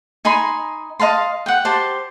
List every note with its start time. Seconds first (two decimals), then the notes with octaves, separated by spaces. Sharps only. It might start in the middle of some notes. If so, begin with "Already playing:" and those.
0.25 D#4 G#5 B5 C6
1.00 D#5 F5 A5 C6
1.46 F#5 G5
1.65 G4 C5 A5